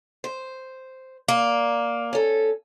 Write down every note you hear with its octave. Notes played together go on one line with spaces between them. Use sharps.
C5
A#3 D5
C#4 A4